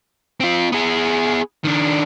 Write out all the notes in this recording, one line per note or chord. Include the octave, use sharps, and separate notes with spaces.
C4 F4
B3 G#4
D#3 D4